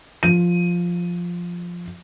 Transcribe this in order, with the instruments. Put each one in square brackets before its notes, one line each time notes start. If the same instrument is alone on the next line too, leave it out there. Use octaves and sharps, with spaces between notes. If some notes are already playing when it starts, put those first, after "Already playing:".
[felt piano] F3 D#7